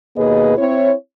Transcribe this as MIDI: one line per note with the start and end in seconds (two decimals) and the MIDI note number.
0.16 0.57 39
0.16 0.57 47
0.16 0.57 58
0.16 0.57 68
0.16 0.57 71
0.16 0.57 75
0.58 0.92 60
0.58 0.92 64
0.58 0.92 73